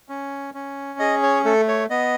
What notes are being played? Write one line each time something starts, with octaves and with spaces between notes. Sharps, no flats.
C#4
C#4
G#4 D#5
C#5
A3 A4
C#5
B3 D#5